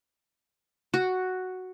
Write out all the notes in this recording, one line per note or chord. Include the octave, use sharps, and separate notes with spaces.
F#4